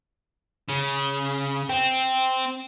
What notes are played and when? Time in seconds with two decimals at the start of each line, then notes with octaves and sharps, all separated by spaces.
0.69 C#3
1.69 C4